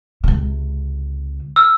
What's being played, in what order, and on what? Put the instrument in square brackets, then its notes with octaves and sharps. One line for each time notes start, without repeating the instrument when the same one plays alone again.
[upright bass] C#2 C3
[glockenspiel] E6 F6